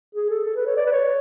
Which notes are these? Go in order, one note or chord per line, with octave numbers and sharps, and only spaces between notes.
G#4
A4
A4
B4
C#5
D5
B4
C#5